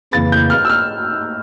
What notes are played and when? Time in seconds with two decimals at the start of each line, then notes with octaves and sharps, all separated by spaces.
0.13 F2 C#3 E3 A#3 E4 A6
0.32 G6
0.50 F6
0.65 E6
0.70 F6